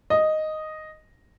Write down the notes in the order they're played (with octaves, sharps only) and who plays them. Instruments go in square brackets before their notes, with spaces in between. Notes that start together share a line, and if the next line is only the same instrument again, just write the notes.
[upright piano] D#5